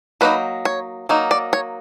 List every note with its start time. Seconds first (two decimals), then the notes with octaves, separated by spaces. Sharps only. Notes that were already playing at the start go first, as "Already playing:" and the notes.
0.21 F#3 A#3 D#4 B4
0.65 C#5
1.09 F#3 A#3 D#4
1.31 D5
1.53 C#5